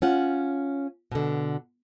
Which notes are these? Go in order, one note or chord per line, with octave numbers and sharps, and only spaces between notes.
C#4 F4 F#5
B2 D3